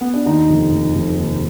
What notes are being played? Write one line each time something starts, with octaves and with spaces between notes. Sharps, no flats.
B3
D4
D#2 D#3 D#4
F1
F1
F1
D#2